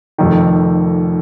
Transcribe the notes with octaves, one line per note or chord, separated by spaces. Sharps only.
F1 F2 D#3